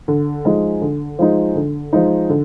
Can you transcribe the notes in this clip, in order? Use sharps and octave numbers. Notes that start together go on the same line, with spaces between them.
D3
F3 G#3 D#4
D3
F3 G#3 D#4
D3
F3 G#3 D#4
D3